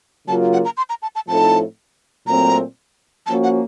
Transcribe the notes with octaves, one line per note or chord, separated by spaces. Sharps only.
C#3 F#3 A#3 F4 A5
F#5
A#5
C6
A#5
A5
A5
A2 F3 C4 D#4 A4 A5
A#2 F#3 A3 C4 A#5
F3 A#3 C#4 F#4 A5
F#5